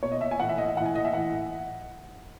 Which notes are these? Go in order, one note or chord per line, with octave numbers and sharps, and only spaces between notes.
B2 C#5
D#5
E5
G#5
A2 E3 F#5
E5
D#5
E5
A2 E3 F#5
G#5
D#5
E5
A2 E3 F#5